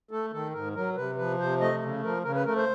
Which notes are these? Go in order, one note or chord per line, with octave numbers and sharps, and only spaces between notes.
A3 A4
D#3 A4
G#2 A#4
F#3 A#4
C3 B4
F3 B4
C3 C5
A3 D#5
C#3
F3 A#4
C#3 A#4
B4
A3 A#4
C5